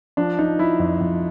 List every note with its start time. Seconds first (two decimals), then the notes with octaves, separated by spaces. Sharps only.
0.17 F3 D4
0.39 F3 D#4
0.59 F3 E4
0.79 F2
1.01 F2